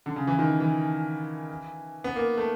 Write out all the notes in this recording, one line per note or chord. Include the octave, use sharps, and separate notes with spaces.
D3
C#3
E3
D#3
E3
B3
A#3
A3